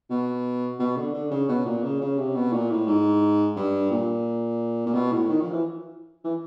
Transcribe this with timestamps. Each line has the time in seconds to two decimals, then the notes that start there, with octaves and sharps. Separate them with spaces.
0.10 B2
0.79 B2
0.96 D3
1.14 D3
1.31 C#3
1.48 B2
1.65 A#2
1.83 C#3
2.01 C#3
2.18 C3
2.35 B2
2.52 A#2
2.70 A2
2.87 G#2
3.56 G2
3.91 A#2
4.86 A#2
4.94 B2
5.12 A2
5.29 D#3
5.41 F3
5.52 E3
6.24 E3